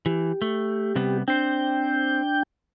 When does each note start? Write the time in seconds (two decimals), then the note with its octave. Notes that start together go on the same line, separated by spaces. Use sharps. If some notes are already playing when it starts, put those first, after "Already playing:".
0.06 E3 G4
0.42 A3
0.96 C3 G3 B3
1.28 C4 D4 C5 G5 G6